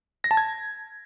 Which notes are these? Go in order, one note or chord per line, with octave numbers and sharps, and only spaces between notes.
A#6
A5
G#6